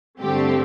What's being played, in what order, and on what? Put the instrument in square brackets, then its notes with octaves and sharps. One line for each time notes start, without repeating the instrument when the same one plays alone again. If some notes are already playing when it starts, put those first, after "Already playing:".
[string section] G2 D3 A3 C4 G4